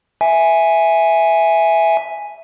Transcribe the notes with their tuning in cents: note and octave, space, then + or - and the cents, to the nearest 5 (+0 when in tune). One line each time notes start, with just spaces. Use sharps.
E5 +0 G#5 +0